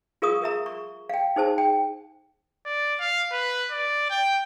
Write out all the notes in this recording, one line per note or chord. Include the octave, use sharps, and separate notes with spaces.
F4 G#4 A#4 F5 C#6 D#6
A#4 E5 A#5
C#6
F5 G5
D#4 G#4 C5 A5
G5
D5
F5
B4
D5
G5